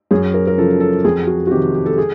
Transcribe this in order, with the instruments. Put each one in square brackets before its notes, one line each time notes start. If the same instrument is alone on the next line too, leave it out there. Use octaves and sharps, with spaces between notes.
[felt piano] F#2 G#4
A#4
A#4
C#3 F3 A4
A4
F2 G#4
F#4
F#4
C3 D#3 G4
G4
A4
G#4